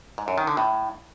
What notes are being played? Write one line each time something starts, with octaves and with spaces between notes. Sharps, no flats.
G#2
F#2
D#3
D3
A2